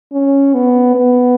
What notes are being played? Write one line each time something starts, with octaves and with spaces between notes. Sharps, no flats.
C#4
B3
B3